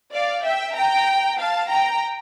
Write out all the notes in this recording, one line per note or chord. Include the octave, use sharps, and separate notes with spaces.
D5 F5
E5 G5
G5 A#5
F5 A5
G5 A#5